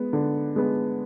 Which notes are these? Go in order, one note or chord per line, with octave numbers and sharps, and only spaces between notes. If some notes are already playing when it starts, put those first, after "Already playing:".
Already playing: G#3 B3
D3
G#3 B3